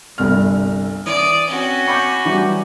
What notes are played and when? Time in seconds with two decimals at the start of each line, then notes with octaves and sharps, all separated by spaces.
0.18 G1 C2 G3 F6
1.06 E3 D5 D#6
1.47 C4 C#4 F#4
1.88 B5 C#6 D6 G6
2.25 E3 F#3 G3 G4